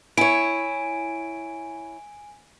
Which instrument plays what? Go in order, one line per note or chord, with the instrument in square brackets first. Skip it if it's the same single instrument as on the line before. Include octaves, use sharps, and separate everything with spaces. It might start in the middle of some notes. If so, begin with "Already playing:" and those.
[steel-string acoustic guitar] E4 C#5 [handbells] G#5 D7